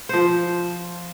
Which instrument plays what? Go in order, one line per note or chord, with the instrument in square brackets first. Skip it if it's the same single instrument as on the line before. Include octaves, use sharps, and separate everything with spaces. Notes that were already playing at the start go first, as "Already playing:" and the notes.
[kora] F3 C5